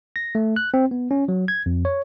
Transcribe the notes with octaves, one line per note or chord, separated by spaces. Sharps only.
A#6
A3
F#6
C4
B3
C#4
F#3
G#6
F2
C#5